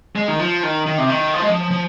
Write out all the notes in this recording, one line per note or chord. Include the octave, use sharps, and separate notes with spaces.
G#3
D#3
F3
D#3
D#3
C3
D#3
F3
G#3
F3
F3